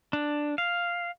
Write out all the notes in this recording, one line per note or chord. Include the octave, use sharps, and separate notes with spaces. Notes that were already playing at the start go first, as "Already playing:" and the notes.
D4
F5